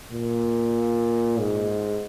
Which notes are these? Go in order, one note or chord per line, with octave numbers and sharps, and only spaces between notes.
A#2
G#2